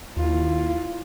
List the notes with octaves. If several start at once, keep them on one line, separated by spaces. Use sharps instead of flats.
D#2 E4 F4